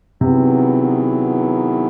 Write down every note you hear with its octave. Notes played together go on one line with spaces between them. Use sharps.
C3 D#3 F#3 B3 E4 G#4